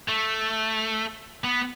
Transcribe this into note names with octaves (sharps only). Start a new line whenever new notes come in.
A3
B3